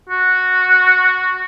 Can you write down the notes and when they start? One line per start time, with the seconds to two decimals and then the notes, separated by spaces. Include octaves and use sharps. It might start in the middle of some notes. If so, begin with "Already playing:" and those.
0.09 F#4